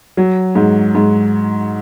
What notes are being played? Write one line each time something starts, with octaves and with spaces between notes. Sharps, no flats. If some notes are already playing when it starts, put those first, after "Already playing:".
F#3
G#2
G#2